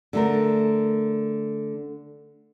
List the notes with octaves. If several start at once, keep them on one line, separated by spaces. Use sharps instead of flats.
D3 A3 A#4